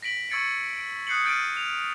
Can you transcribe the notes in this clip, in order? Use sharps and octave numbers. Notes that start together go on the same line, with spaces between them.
A#6 B6 D7 F#7
C#6 E6 G#6 A6 C#7 D7
D7
D#6 F#6 G6 C7 C#7 F#7
F6 G6 A6 D7 D#7
F7